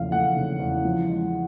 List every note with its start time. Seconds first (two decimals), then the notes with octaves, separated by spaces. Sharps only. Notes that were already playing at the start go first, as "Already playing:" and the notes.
Already playing: E2 C#3 F3 A3 F5
0.12 A3 F#5
0.36 C#3
0.60 E2
0.84 F3
1.09 G#3